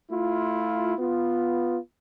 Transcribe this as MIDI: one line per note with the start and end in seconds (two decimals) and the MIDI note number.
0.10 0.93 57
0.10 0.93 64
0.10 0.93 65
0.98 1.79 59
0.98 1.79 65